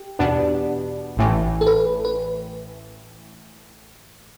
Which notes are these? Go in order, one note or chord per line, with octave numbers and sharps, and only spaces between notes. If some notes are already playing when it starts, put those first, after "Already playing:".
Already playing: G4
E2 B2 B3 D4
A1 A2 E3
A4
B4
B4